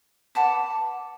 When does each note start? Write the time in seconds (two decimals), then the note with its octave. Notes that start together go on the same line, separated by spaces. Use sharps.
0.35 B4 F#5 A5 D6